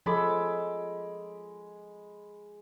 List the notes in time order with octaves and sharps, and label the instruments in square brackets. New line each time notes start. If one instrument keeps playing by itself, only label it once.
[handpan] F3 A4 [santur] G#3 B5 D6